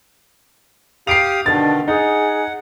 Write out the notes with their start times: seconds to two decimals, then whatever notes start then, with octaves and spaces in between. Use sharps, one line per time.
1.07 G4 F5 D#6 C7 D7 F7
1.46 B2 D3 D#3 D4 A6
1.88 D#4 G#4 F#5